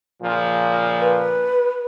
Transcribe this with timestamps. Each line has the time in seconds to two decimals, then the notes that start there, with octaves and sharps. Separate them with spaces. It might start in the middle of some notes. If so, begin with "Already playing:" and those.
0.22 A#2 C#3 F3
0.99 B4